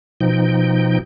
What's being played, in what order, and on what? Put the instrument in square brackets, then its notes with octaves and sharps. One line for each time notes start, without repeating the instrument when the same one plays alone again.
[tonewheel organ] B2 F3 D#4 G5